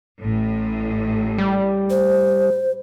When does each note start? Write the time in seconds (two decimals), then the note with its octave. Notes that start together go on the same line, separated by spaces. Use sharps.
0.22 A1 A2
1.38 G3
1.90 C5